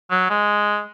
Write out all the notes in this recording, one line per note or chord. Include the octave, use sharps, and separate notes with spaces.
F#3
G#3